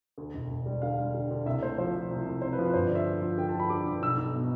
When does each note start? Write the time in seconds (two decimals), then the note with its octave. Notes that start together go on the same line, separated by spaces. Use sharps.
0.18 D2
0.34 E1
0.50 E1
0.66 G3
0.82 D3 F5
0.98 G3
1.14 D3
1.31 D3
1.46 C2 E5
1.62 A3 C5
1.78 F3 C5
1.94 F3
2.10 C2
2.26 C2
2.42 C3 C5
2.53 B4
2.59 F3
2.64 B4
2.74 G1 C5
2.85 D5
2.91 D3 E5
3.06 D3
3.22 F3
3.38 D3 G5
3.49 A5
3.55 F3 B5
3.70 D3 D6
3.86 G2
4.02 B1 E6
4.18 B1
4.34 B2